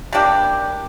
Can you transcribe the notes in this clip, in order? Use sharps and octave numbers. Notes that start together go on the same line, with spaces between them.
G3 A#3 D4 G4